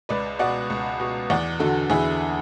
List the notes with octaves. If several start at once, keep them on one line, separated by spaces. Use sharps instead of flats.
C#2 B4 D5
B2 D5 F#5
C#2
B2
E2 D5 F#5
D3 F#4 A4
E2 E4 G#4